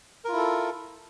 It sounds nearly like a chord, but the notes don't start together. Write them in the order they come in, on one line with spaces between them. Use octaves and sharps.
A#4 F4 E4 A4